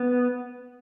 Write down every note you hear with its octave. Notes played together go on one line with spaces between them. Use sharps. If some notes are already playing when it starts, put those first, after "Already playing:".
Already playing: B3